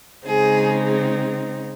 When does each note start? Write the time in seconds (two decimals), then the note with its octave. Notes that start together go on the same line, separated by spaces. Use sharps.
0.25 C#3 G#3 C4 D#4 G#4